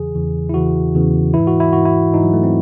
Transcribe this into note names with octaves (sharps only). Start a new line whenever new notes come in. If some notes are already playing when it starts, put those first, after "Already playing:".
Already playing: E2 C#3 E3 G#4
E2 C#3 E3
E4
E2 C#3 E3 F#4
E2 C#3 E3
G#2 E3 E4
F#4
E4
G#2 E3 F#4
E4
G#2 E3 D#4
F#3
A3
C4